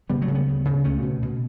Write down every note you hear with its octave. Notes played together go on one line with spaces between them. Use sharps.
C#3 G3 B3
F#3 A3
C#3
G3 B3
D2
C#3
C#2 A3 C#4
B2
B2